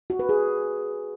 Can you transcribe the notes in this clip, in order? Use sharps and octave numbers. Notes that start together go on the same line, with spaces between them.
F#4
B4
G#4